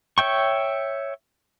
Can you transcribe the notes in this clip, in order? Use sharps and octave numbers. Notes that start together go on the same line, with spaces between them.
C#5 E5 G5 C#6